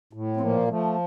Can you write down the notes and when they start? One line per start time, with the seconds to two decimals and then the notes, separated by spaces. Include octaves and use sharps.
0.13 A2
0.37 C4
0.41 A#2 F3 A#3
0.68 F3 A3